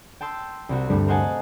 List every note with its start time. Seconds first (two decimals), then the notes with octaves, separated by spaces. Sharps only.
0.21 G5 A5 C6 E6
0.69 C2 C4 F#4
0.90 D2 G2 G3 A3 C4
1.07 A#4 C5 D#5 F#5 G#5 A5